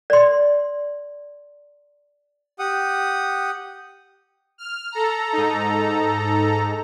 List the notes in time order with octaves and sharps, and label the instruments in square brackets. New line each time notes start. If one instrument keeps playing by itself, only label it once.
[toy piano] D5 C6
[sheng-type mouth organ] G4 F#5 D#6
[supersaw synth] F6
A4 A#5
[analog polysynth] G#2 D#4